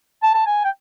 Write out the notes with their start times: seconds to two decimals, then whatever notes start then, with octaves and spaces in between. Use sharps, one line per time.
0.23 A5
0.34 A5
0.47 G#5
0.64 G5